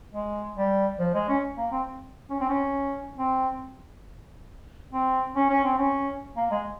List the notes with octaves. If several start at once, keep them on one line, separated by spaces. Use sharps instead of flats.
G#3
G3
F3
G#3
C#4
A#3
C4
C#4
C4
C#4
C4
C4
C#4
C#4
C4
C#4
A#3
G#3